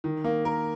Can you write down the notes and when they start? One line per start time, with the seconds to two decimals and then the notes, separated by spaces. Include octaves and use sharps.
0.04 D#3
0.24 A#3
0.45 A#4